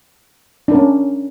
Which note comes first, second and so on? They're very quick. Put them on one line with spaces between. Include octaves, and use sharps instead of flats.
D4 A#4 C#4